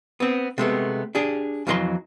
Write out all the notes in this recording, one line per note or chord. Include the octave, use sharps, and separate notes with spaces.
B3 C4
C3 G#3 A3 B3
D4 G4 G#4
F2 E3 F#3 G#4 D#5 C6